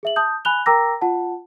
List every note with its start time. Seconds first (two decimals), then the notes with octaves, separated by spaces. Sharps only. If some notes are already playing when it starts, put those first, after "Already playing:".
0.03 G#4 E5 F#7
0.16 A5 D#6 G6
0.45 G#5 B5 F#6 F7 G7
0.66 A#4 G5 A#5 D6 E6 A#6
1.02 F4 F#5 A5